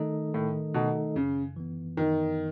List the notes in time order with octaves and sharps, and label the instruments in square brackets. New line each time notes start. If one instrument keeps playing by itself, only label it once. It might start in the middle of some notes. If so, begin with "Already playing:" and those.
Already playing: [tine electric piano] D#3 A3 D#4 A4 D#5
[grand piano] A2 [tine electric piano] D#3
[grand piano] B2 [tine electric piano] A3 D#4 A4 D#5
[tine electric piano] F#2 [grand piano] C#3
[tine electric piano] E3 B3
[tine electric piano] F#2 [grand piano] D#3